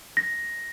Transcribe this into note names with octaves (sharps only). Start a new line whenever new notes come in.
A#6